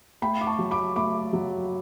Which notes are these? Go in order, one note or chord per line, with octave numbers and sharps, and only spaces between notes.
A3 G5 B5
D6
A5 C#6
F#3
B5 D6
A3 B5 D6
F#3